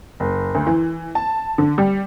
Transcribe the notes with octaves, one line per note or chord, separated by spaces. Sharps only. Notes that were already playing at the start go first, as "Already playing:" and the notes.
F#1
D2
E3
A5
D3
G3